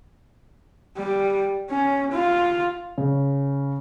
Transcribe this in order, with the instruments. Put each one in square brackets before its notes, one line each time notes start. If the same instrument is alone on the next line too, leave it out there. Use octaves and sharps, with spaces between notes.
[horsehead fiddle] G3
C#4
F4
[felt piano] C#3